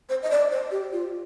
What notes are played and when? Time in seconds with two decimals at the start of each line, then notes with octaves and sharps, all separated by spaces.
0.09 C5
0.23 D#5
0.31 D5
0.51 C5
0.71 G4
0.92 F4